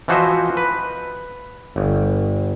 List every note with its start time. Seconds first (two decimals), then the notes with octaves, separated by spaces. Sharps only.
0.08 E3 F3 F#4 C5 D#5 E5
0.57 B4
1.76 G1